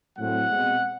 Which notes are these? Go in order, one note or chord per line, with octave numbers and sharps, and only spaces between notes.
A2 F#3 A3 C4 F#5
B2 G#3 C4